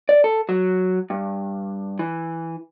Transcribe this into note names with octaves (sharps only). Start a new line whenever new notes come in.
D5
A4
F#3
G2
E3